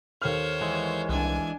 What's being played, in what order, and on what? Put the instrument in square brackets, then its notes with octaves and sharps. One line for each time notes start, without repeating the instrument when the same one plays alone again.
[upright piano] D#2 A4 F6 [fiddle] C5 C#5
[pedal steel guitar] E3 G#3
[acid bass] C2 [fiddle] D4 G#5